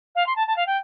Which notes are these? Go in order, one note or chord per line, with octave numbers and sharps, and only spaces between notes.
F5
C6
A5
A5
F5
G5